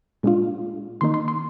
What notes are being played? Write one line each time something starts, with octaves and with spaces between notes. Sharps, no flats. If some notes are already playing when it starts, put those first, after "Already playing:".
A#2 G#3 D4 F4
D#3 A#3 D#4 C6
C6
C6